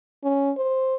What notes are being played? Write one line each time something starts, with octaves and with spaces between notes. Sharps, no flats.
C#4
C5